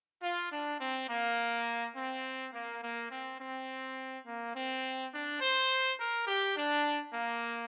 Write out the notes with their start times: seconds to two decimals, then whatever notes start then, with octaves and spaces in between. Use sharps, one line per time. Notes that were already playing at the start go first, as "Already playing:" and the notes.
0.22 F4
0.49 D4
0.79 C4
1.08 A#3
1.95 C4
2.53 A#3
2.80 A#3
3.10 C4
3.39 C4
4.25 A#3
4.54 C4
5.12 D4
5.41 C5
5.98 A#4
6.27 G4
6.56 D4
7.14 A#3